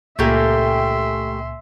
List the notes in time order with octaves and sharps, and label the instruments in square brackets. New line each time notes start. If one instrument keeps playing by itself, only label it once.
[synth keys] C#2 A#2 G#5 [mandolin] A3 A#3 G4 [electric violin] E5 C6